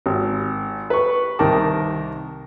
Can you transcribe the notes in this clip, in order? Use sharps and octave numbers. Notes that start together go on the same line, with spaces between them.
G#1
B4 C#6
C2 D#3 A#4 G5 A5 D6